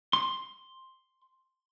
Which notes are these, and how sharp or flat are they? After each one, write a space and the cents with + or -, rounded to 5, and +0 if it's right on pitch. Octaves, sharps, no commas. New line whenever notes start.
C6 +5